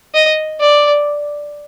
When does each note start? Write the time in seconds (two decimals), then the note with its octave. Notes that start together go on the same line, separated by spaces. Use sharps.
0.14 D#5
0.61 D5